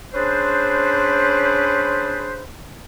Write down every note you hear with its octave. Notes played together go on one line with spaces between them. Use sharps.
C#4 D4 G#4 B4 C5